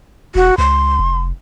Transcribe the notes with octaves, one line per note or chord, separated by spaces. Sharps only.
E1 F#4
C#2 C6
F1